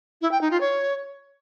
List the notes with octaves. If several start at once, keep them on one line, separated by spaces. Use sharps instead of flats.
E4
G5
D#4
F4
C#5